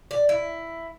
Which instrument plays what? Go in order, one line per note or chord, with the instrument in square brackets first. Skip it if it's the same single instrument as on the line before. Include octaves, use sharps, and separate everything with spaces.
[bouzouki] D5
E4